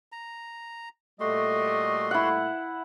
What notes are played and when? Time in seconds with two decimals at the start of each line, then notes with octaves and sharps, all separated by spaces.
0.12 A#5
1.20 A#2 G3 A3 F#4 D#5 C6
2.11 E4 F#5